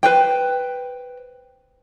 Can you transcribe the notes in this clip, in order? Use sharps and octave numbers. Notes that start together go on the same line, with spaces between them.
B4 C5 G5